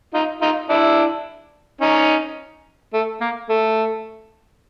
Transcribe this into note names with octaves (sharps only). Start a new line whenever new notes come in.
D#4 F4
D#4 F4
D4 E4
C#4 D#4
A3
A#3
A3